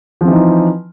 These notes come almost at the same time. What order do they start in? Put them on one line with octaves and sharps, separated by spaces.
F3 C4 E3 D#4